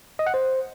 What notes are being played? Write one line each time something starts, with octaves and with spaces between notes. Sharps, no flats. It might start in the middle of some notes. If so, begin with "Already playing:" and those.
D#5
F#5
C5